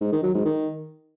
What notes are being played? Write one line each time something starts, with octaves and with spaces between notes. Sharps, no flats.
G#2
D#3
F#3
G#2
D#3